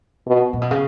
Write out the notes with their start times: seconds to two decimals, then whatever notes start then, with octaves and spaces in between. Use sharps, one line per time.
0.26 B2
0.53 A#2
0.62 B2
0.71 C#3